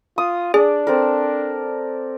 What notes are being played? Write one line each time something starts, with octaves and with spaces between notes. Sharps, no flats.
F4 D#6
D4 G#4 D5
C4 A4 A#4